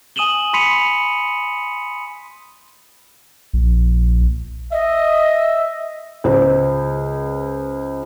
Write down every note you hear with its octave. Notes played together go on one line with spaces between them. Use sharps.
G#5 D#6 D#7 E7 F#7 G7
B5 C6 B6 C#7 D#7 F7
A#1
D#5 E5
C#2 C5